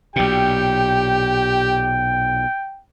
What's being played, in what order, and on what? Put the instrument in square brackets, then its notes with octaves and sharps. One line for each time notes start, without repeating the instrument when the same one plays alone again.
[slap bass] B1 A#2 [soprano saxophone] G4 [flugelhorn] G5